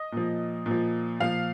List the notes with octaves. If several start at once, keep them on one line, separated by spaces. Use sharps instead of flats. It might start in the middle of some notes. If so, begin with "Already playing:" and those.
Already playing: D#5
A#2 F3
A#2 F3
A#2 F3 F5